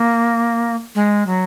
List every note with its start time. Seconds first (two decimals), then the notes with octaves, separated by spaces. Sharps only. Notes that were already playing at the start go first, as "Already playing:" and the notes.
Already playing: A#3
0.95 G#3
1.27 F#3